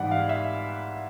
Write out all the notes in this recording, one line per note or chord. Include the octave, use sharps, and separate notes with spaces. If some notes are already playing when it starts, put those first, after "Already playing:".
Already playing: G#2 E3 G3 F#5
F5
E5